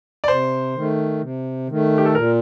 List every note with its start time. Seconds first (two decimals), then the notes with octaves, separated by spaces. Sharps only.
0.24 D5
0.28 C3 C5
0.75 D#3 A3
1.21 C3
1.68 D#3 A3
1.98 G4
2.05 A4
2.15 A#2 A#4